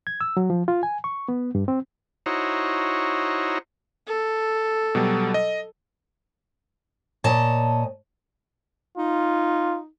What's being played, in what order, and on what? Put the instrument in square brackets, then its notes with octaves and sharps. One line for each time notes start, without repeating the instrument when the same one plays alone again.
[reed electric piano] G#6
E6
F#3
F3
F4
G#5
C#6
B3
G2
C4
[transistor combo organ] D#4 E4 F#4 C5 C#5 A#5
[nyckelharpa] A4
[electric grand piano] B2 F#3 G3
D#5
[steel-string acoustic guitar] A#2 C#5 D#5 A5
[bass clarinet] D#4 [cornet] F4